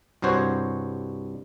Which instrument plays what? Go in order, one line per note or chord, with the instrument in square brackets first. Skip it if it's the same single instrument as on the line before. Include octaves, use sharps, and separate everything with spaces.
[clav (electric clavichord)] C2 G2 F#4 C5 C#5